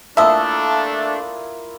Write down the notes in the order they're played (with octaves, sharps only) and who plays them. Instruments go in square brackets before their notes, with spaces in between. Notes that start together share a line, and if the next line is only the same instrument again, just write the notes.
[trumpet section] A3 D4 [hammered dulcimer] A#3 E4 F4 [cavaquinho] A4 D#5 [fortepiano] E5